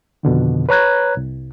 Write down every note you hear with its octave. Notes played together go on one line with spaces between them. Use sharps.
F2 B2 D3 D#3
B4 C#5 A#5 F#6 G#6
C2